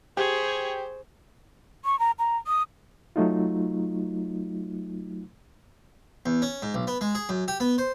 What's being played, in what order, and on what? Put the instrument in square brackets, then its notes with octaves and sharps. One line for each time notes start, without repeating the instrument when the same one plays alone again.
[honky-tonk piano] G4 [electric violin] G#4 C#5 [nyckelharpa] C5
[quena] C#6
A#5
A#5
D#6
[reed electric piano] F#3 A3 D#4 F4
[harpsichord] E2
C#4
G#2
B1
B3
G#3
G#4
F#2
G4
B3
C5